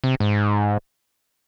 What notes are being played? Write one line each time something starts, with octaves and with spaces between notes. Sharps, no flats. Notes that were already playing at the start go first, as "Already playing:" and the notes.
C3
G#2